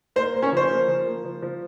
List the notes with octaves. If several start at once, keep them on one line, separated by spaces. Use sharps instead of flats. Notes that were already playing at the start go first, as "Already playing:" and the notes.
A#3 C5
A#3
C#4 C#5
F3 C5
A#3
F3
A#3
F3
F3